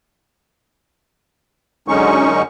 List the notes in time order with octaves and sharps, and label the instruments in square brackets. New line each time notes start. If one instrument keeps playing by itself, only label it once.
[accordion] F#2 D3 G#3 C#4 D#4 C#6